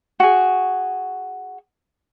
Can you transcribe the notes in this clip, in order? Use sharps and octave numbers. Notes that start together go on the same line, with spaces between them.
F#4 G#4